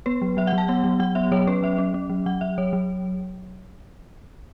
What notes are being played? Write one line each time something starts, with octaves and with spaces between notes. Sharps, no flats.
B3 B4
F#3
F#3 E5
F#5
F#3
A5
B3 F#5
F#3
F#3 F#5
B3 E5
F#3 C#5
C#4 B4
F#3 E5
C#4
C#4
F#3
F#3 F#5
F#3 E5
F#3 C#5
F#3